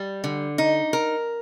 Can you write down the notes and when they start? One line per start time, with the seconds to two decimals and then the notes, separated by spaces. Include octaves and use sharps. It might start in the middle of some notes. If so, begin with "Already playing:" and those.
Already playing: G3
0.24 D3
0.58 D#4
0.93 A#4